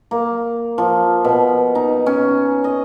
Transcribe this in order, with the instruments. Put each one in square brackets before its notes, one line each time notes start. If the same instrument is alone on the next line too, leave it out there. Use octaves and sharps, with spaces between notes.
[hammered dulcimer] A#3
F3
B2
D#4
C#4
D#5